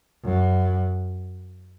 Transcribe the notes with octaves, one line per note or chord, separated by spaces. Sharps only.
F#2